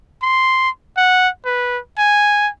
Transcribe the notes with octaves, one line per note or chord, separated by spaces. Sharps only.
C6
F#5
B4
G#5